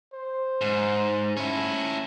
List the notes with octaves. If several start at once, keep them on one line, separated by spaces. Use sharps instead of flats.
C5
G#2
C#4 E4